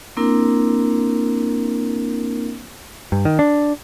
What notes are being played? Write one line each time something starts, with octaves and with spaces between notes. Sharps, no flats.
A#3 C4 D4 E4 A#4
G2
D#3
D4